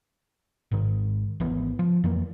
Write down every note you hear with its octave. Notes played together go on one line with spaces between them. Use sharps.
G#1 G#2 D#3
G#1 E3 B3
F3
F2 E3 A#3